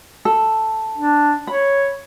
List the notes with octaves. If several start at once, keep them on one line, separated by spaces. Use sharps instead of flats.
A4
D4
C#5 B5